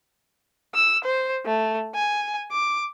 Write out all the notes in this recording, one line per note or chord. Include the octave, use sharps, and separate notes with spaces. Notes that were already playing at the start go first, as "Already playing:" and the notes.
E6
C5
A3
G#5
D6